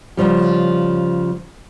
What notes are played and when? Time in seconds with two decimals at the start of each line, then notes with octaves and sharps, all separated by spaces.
0.17 C#3 F3 G3